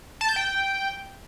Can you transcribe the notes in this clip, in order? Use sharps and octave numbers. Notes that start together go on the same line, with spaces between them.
A5
G6
G5